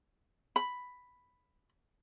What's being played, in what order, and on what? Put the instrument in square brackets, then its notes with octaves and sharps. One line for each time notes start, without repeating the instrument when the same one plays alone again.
[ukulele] B5